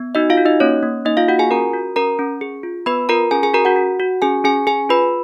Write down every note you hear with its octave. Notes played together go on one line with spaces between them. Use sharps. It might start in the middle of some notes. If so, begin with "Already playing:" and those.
Already playing: B3
D#4 F#4 D#5
F4 F5
F#4
D#4 D#5
A#3 C#4 C#5
A#3
A#3 D#4 D#5
F4 F5
F4 F#4 F#5
G#4 G#5
C#4 A#4 A#5
F#4
C#4 A#4 A#5
C#4
G#4
F4
B3 B4 B5
F4 A#4 A#5
C#4 G#4 G#5
G#4 G#5
F#4 A#4 A#5
F#4 F#5
F#4
F#4
C#4 G#4 G#5
C#4 G#4 G#5
G#4 G#5
F4 B4 B5